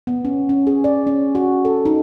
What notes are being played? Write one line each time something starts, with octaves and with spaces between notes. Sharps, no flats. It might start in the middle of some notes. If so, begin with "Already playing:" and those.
B3
C#4
C#4
G#4
D5
C#4
F#4
A4
D#4